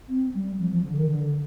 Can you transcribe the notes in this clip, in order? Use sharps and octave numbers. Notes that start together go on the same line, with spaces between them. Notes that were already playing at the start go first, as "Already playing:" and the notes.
C4
G3
F3
F3
D3
D#3
D3